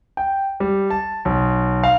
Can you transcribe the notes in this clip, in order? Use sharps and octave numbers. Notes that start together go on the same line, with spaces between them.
G5
G3
A5
B1
F5